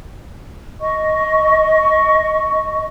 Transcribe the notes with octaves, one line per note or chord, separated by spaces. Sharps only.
D#5 C#6